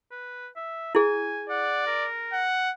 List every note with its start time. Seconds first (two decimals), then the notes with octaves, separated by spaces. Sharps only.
0.11 B4
0.56 E5
0.95 E4 G#4 G#5
1.50 D5 F#5
1.86 A#4
2.33 F#5